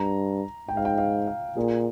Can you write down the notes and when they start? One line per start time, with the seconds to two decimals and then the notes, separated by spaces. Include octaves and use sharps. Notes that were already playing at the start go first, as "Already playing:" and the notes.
Already playing: G2 A#5
0.69 G#2 G5
0.77 F5
0.85 G5
0.98 F5
1.27 F5
1.57 A#2 G#4